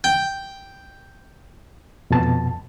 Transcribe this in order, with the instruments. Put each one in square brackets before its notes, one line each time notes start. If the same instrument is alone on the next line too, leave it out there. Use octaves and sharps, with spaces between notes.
[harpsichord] G5
[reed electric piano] F2 B2 A5